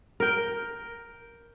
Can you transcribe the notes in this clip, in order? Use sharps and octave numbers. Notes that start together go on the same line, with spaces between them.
A#4 G5